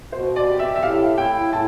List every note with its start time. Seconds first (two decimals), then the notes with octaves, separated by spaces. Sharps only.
0.12 B2 C5
0.36 D5
0.48 G4
0.59 E5
0.75 E5
0.82 A2 F5
1.18 E4 G5
1.52 A2 A5